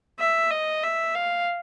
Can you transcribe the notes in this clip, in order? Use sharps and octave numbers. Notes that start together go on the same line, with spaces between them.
E5
D#5
E5
F5